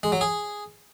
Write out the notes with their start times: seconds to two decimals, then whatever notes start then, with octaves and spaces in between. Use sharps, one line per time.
0.03 G#3
0.12 F#3
0.21 G#4